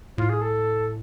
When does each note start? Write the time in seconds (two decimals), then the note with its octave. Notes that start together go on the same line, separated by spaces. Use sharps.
0.17 A2 F4
0.29 G#4
0.41 A4